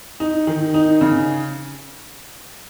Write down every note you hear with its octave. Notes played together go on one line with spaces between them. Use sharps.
D#4
D#3
D#4
C#3